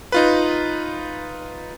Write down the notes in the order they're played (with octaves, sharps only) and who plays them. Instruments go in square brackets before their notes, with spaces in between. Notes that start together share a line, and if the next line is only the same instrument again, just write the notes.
[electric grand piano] D#4 F4 B4